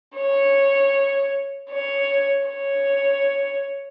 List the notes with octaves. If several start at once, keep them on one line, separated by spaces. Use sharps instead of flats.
C#5
C#5
C#5